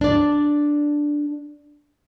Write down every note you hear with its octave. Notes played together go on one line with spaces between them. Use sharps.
D4 D5